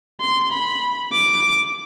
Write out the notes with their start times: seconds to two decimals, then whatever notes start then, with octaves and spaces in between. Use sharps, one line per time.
0.20 C6
0.51 B5
1.12 D6